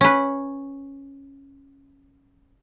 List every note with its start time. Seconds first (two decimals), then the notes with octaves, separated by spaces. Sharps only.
0.01 C#4 B4